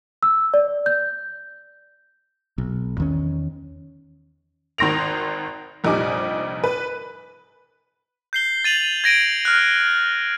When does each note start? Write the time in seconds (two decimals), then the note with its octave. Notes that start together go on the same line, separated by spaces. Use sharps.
0.23 E6
0.54 D5
0.86 G6
2.58 B1
2.98 E2 D#3 C#4
4.78 G#1 D#3 C6 A#6 D7 F7
5.84 F1 A#1 G3 D#4 G#5 D6
6.64 B4
8.33 G6 C7 G7
8.64 A6 D#7 F7 F#7
9.04 G#6 A#6 D7 D#7
9.45 F6 F#6